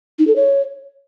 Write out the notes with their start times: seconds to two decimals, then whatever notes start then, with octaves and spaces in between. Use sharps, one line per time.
0.19 D#4
0.27 A4
0.36 C#5